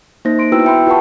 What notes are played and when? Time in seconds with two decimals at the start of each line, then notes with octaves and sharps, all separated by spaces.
0.25 A#3 D#4 C5 A#6
0.39 C6 D7
0.52 B3 E4 F#4 B4 G5 E6
0.65 E5 G5 B5 C6
0.87 F4 G4 B4 F#5 A5 C#6